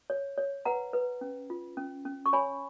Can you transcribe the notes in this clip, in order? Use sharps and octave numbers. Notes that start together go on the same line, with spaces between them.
C#5
C#5
B4 F#5 A#5
B4
C#4
F4
C#4
C#4
C#6
C#5 G#5 B5